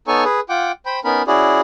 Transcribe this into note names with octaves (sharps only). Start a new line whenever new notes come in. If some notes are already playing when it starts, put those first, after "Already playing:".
B3 D#4 A4 C#5 G#5 C#6
G#4 B4
F4 F#5 G5 D6
C5 G5 B5
B3 C#4 D#4 A#4 B5
C#4 E4 F#4 G#4 D5